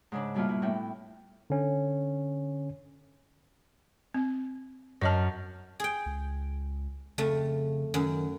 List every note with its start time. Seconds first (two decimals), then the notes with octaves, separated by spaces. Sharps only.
0.12 G#2 C#3 D4
0.34 G2 B2 G3 A#3 E4 F4
0.49 E4
0.62 A2 B3 E4 G5
1.50 D3 C#4
4.14 C4
5.01 F#2 C#5 D#5 A5 F6
5.80 G#4 G5
6.06 C#2
7.18 F2 C#3 A3
7.94 F#2 D#3